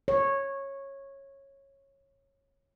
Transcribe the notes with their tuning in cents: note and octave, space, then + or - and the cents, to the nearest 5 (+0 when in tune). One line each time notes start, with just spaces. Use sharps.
C#5 -15